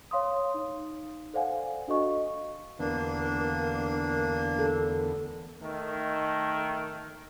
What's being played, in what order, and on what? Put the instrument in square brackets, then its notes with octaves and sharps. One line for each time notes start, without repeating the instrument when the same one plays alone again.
[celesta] C#5 F5 C6 D#6
D#4
A4 C5 D5 F5 F#5 G#5
D4 F#4 A4 D#5 C#6
[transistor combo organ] E2 D3 B3 [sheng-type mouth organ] A#3 D4 [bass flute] A#4
[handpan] A4
[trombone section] D#3 A3